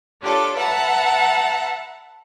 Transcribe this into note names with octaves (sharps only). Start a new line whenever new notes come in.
D4 F4 G4 A4 C#5
B4 E5 F#5 A5 A#5